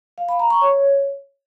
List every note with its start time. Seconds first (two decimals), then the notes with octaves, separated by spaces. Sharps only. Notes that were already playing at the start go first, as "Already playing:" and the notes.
0.18 F5
0.29 B5
0.40 A#5
0.50 C#6
0.61 C#5